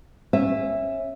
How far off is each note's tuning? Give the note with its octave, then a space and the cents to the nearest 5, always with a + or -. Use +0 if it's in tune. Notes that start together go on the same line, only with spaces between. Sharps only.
C#4 -25 E5 +0